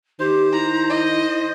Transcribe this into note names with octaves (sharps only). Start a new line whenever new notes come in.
D#3 G4 C5
E4 A#5
D#5